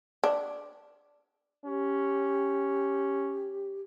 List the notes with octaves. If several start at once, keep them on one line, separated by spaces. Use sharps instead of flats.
D4
C#4 G4